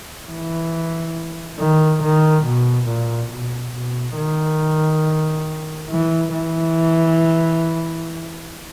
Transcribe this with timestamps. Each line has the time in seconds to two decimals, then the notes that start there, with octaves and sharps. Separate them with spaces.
0.29 E3
1.58 D#3
2.02 D#3
2.44 B2
2.88 A#2
3.31 B2
3.74 B2
4.16 D#3
5.90 E3
6.32 E3